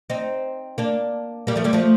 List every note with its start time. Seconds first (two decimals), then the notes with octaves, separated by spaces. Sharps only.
0.10 C4 D#4
0.78 A#3 D4
1.47 G3 A#3
1.56 F3 A3
1.64 G3 A#3
1.73 F3 A3